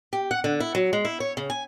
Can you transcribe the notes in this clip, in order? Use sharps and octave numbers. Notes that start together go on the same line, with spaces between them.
G4
F#5
D3
E4
F#3
G#3
E4
C#5
C#3
G#5